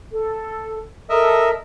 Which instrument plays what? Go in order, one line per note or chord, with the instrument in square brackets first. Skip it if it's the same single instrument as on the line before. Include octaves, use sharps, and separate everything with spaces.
[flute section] A4
[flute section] A4 [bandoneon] A#4 D#5 E5